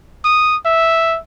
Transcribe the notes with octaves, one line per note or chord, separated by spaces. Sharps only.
D#6
E5